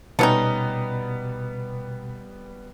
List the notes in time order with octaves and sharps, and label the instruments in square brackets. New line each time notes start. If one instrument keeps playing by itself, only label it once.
[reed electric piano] B2 [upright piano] G3 B3 [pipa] A3 C#4 D#4